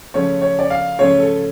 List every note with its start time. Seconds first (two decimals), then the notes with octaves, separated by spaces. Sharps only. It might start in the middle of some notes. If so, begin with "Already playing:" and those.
0.14 C#3 F3 A3 C#4 C#5
0.42 C#5
0.59 D5
0.70 F5
0.98 C#3 F3 A3 C#4 C#5
1.20 A4